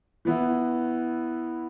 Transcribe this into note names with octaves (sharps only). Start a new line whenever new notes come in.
E3 B3 E4